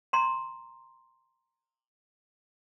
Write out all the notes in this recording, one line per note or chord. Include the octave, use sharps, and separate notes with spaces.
A#5 C6